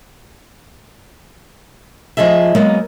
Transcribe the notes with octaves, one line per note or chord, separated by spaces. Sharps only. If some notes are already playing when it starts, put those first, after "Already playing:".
F3 F4 G#4 D#5 E5
F#3 G#3 A#3 B3